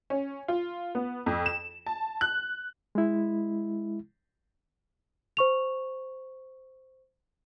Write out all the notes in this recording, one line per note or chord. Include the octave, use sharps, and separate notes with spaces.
C#4
F4
B3
F2
E7
A5
F#6
G#3 E4
C5 C#6 F7